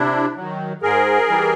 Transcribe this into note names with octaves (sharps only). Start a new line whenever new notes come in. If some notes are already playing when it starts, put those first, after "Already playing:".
Already playing: C3 D4 E4
D#3 F#3
G#2 G#4 A#4
E3 G3